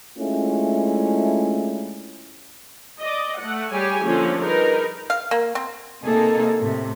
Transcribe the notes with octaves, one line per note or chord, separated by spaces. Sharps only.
G#3 A3 C#4 D4 E4 F4
D5 D#5
A3 F#5
G3 G4 G#4 C#5 G#5
D3 F3 A#3 C#4
G3 D#4 G#4 A#4 B4
F5
A#3
C4
C3 A#3 D#4 G#4 A4
A2 C3